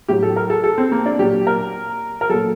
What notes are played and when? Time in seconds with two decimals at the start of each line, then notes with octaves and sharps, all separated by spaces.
0.08 A2 F#3 G4
0.23 A4
0.36 A#4
0.50 A4
0.64 A4
0.78 C4
0.92 A#3
1.06 D4
1.19 A#2 F#3 G4
1.47 A#4
2.21 A#4
2.29 A#2 F#3 A4